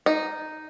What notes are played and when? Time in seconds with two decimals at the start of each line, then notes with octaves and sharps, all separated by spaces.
0.06 D#4